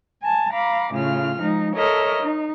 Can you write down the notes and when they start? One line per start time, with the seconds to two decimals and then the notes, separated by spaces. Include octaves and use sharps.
0.23 G#5 A5
0.53 F5 A#5 B5 D6
0.93 A2 C#3 F4 F6
1.39 F3 G#3 D#4
1.74 A4 A#4 C#5 D#5 E5 F6
2.22 D#4